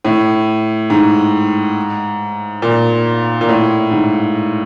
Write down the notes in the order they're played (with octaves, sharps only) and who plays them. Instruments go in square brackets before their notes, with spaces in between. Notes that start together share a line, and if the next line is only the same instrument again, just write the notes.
[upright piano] A2
G#2
A#2
A#2
A2
G#2